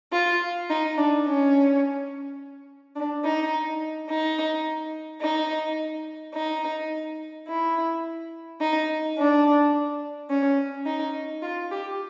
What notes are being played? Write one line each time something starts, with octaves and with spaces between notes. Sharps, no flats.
F4
D#4
D4
C#4
D4
D#4
D#4
D#4
D#4
E4
D#4
D4
C#4
D#4
F4
G4